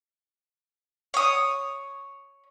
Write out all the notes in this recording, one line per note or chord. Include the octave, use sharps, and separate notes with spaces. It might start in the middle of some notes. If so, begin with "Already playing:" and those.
C#5 D#6